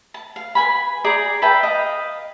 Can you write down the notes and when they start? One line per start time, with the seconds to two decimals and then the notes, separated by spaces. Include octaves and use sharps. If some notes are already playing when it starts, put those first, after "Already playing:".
0.14 A5
0.36 F5
0.55 B4 G#5 B5
1.04 G#4 D5 G5 A#5
1.42 B4 E5 G5 A5
1.63 D#5 F5 G5